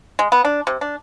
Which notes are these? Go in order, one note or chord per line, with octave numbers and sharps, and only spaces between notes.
G#3
B3
D4
C3
D4